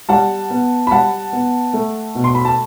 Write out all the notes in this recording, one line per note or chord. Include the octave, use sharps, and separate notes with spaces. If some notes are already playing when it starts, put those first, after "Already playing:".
G3 F#5 A5
B3
B5
G3 F#5 A5
B3
A3
B2
C6
B5
A5